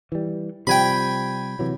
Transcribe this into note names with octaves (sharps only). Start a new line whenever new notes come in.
E3 G3
C3 F3 G3 G5 G#5 B5
C3 E3 F#3